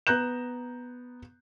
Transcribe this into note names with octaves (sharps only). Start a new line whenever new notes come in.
B3 A#5 F#6 G6 E7